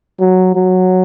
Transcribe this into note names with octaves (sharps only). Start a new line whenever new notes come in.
F#3
F#3